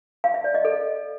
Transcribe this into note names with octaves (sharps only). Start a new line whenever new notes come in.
F5
E5
D5
D#5
A4